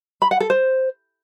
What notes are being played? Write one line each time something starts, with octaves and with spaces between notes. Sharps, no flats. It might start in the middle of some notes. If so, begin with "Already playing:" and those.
B5
F#5
A4
C5